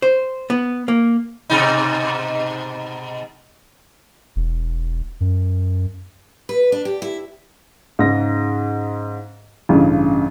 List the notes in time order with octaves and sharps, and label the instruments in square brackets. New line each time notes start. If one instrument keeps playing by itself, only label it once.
[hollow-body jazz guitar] C5
B3
A#3
[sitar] G#2 B2 D#4
[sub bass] E1
F#2
[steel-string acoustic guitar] B4
D4
G4
E4
[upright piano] G#2 C#3 A#6
A1 G2 C#3